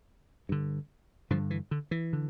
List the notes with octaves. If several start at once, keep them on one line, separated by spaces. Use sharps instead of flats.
G2 D3
G2 D3 F3
E3
D3
E3
D3